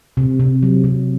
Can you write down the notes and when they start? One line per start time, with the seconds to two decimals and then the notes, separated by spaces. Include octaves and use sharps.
0.17 C3
0.40 C3
0.63 F#3
0.84 C3